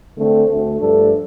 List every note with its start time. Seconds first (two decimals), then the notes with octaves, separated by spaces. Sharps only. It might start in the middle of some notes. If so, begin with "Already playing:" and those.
0.16 D3 A3 C4
0.48 D2 D3 A3
0.80 G2 F3 A3 D4 A4